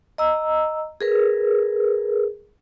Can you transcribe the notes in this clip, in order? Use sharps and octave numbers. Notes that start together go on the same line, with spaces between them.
D#5 A#5 E6
G#4 A#4 B4